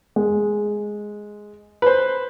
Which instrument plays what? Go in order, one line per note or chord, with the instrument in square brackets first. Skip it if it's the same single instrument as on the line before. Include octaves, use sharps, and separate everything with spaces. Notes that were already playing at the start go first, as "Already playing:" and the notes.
[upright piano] G#3
[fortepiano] B4 C5